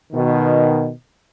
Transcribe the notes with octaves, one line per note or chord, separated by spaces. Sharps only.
B2 D#3